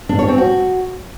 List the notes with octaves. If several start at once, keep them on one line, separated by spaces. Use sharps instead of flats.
D4
C#5
C4
F#4